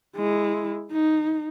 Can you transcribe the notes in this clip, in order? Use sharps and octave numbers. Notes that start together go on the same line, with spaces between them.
G#3 E4
D#4